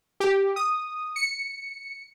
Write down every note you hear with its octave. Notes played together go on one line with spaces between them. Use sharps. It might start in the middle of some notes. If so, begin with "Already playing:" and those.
G4
D#6
C#7